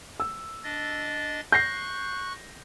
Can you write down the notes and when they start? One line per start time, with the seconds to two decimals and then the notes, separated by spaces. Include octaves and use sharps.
0.20 E6
0.64 D4 D#5 A6
1.52 C#6 F#6 G6 A#6 C7